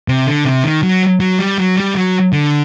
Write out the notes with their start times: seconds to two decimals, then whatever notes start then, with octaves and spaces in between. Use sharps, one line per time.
0.08 C3
0.27 D3
0.45 C3
0.64 D#3
0.83 F#3
1.20 F#3
1.39 G3
1.58 F#3
1.76 G3
1.95 F#3
2.33 D3